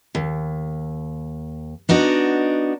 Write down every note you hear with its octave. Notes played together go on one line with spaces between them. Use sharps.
D#2
B3 D4 D#4 F#4